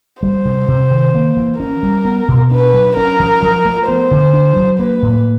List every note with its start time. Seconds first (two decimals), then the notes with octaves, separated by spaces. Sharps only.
0.23 G3 C5
0.45 C3
0.68 C3
0.91 D#3
1.15 A#3
1.37 E3
1.59 C#4 A#4
1.83 G3
2.05 B3
2.28 B2
2.51 D4 B4
2.74 F#3
2.97 C#4 A#4
3.20 F3
3.42 F3
3.65 A3
3.87 B3 C5
4.11 D3
4.34 D4
4.56 F#3
4.79 A#3 B4
5.02 A2